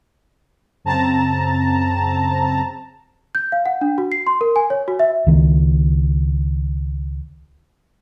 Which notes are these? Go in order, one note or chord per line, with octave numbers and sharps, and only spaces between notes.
F#2 C#3 C4 A5 A#5
G6
F5
F#5
D4
F#4
C7
C6
A#4
G#5
C#5
F#4
E5
C#2 D#3